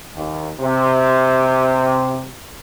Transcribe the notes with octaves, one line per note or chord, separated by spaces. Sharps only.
D#2
C3